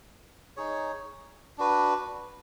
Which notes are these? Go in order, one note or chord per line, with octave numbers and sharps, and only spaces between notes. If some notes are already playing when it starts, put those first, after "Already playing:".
D#4 G#4 C#5
D4 F#4 B4